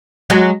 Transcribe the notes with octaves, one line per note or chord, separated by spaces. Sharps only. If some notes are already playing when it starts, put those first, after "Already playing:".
F#3 G#3